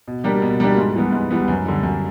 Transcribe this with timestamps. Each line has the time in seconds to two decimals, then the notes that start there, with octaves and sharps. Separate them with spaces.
0.08 B2
0.24 G3 A#3 D4 G4
0.42 B2
0.60 G3 A#3 D4 G4
0.78 G#2
0.95 E3 G3 B3
1.12 G#2
1.31 E3 G3 B3
1.48 F#2
1.66 D3 G3
1.83 F#2